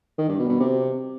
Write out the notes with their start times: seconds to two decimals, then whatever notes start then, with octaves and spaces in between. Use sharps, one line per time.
0.19 D#3
0.29 G2
0.39 B2
0.49 B2
0.60 C3